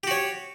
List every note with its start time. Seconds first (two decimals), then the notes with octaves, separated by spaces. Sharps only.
0.03 G4
0.07 F#4
0.11 C#5